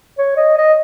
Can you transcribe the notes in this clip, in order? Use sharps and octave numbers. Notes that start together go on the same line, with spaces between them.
C#5
D#5
D#5